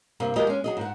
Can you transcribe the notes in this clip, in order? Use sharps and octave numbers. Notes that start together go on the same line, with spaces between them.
G2 C3 A#3
D#2 F#3 G#3 G4 A#4 D#5
G#3 C#4
F#3 G#4 D#5
G#2 F#5